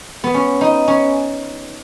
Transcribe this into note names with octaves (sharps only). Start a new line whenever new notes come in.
B3
C#4
D#4
C#4